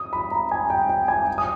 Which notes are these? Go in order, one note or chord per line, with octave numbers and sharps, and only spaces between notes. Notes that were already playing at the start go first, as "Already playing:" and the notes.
Already playing: D#6
B5
A#5
G#5
G5
G5
G#5
D#6